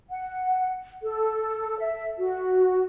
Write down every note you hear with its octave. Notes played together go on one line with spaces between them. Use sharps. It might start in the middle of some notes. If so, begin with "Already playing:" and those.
F#5
A4
E5
F#4